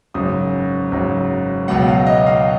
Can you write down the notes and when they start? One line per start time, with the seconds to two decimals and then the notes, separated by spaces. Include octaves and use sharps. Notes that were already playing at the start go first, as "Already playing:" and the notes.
0.14 G#1 F#2 C#3 F#3 D#6
0.91 G#1 F#2 C#3 F#3
1.68 C#2 B2 F#3 F#5
1.88 F5
2.06 D#5
2.26 F5